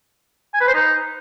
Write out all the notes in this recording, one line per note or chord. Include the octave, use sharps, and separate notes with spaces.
G#5
B4
C5
D#4